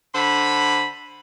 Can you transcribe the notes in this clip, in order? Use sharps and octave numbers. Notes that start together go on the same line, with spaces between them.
D3 C5 B5